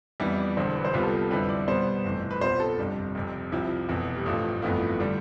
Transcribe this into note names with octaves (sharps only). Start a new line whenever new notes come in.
F2 E3 G3 B3 E4
D5
E1 E2 D3 C5
B4
C5
C2 C3 G3 B3 F4 B4
A4
A4
F2 D3 G3 C4 E4 B4
D5
B2 G3 B3 C5
G1 F2 C3 E3 A3
B4
C2 B2 B3 F4 C5
A4
G1 F2 C3 G3 D4
F1 F2 C3
C2 C3 F3 E4
F1 E2 B2
G3
A1 G2 F3 A3
G1 F2 E3 A3 B3 F4
D3 G3 D4